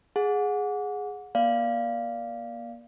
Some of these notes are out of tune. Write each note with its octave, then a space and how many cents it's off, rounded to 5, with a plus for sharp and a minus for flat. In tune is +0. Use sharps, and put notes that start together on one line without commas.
G#4 +0 F#5 -25
A#3 +30 D5 +0 F5 -10